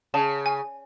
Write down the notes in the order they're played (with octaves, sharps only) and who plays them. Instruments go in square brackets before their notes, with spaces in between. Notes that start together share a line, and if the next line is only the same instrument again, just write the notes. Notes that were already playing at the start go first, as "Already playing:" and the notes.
[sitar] C#3 [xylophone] A5
[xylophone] G#5